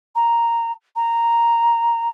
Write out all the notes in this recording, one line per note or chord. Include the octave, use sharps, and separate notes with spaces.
A#5
A#5